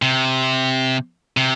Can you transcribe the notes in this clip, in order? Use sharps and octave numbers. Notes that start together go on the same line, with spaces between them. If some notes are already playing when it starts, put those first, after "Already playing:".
C3
C3